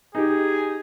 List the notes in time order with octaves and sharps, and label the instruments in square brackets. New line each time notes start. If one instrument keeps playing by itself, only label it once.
[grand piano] D#4 G4 [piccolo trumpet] G#4